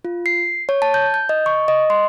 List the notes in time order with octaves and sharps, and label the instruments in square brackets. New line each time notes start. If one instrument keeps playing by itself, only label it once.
[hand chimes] F4
C7
C#5
A5
G6
G6
D#5
C#6
D#5
C6